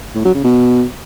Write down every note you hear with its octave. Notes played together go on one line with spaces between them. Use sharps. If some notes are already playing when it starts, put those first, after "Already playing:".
A2
F#3
C#3
B2